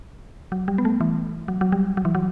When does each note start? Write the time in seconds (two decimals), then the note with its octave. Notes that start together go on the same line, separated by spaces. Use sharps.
0.52 F#3
0.68 G3
0.78 B3
0.85 A3
1.01 E3
1.48 F#3
1.61 F#3
1.72 G3
1.97 F#3
2.05 E3
2.15 F#3